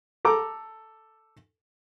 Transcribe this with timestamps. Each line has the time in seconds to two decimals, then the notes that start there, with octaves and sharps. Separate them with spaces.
0.25 A4 A#5 D6